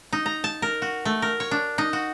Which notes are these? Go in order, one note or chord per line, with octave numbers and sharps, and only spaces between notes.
D#4
A#5
A5
A#4
F#4
A3
A#4
C#5
D4
D#4
F#4